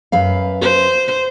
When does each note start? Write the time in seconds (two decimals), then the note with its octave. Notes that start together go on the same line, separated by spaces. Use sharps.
0.12 F#2 B4 F5
0.61 C5